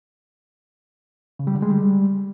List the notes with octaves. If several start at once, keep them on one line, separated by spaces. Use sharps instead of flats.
C#3
G3
D3
G#3
G3